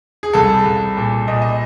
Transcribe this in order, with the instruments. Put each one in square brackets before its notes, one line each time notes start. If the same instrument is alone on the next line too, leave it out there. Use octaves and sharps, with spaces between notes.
[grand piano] G#4
C2 A4
C2
A#2
A#2 D#5
D#5